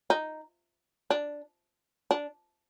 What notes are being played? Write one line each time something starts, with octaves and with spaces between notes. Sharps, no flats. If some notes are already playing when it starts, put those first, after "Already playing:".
D#4
D4
D4